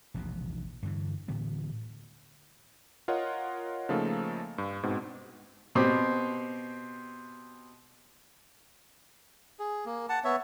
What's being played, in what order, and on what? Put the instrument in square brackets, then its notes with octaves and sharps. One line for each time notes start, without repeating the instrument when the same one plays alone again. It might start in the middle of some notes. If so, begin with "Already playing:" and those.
[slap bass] E1 A#1 D#2 C3
G2 D3 E3
A2 D3 E3 B3
[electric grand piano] F4 A#4 C#5 D#5 F#5
C#3 F3 A3 A#3 D#4 A4
G2
G#2 B2 C4
[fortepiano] B2 C4 G4
[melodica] G#4
A#3
F#5 A5
B3 C#5 E5